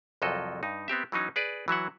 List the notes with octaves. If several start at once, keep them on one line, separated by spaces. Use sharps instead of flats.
C2 F2 F3 F#3 A4 D#5
G2 D#4
B3 C4 G4 E5
E3 F#3 C#4 D#4
G#4 B4 D5
E3 F#3 E5 F#5